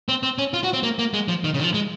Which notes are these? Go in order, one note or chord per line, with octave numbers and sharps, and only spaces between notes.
C4
C4
C#4
F4
F#4
C4
A#3
A#3
G#3
F3
D#3
C#3
D#3
F3
G#3